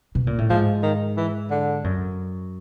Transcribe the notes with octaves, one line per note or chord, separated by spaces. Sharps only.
B2
A#2
A2
G#2 F3
D#3
E3
D3
F#2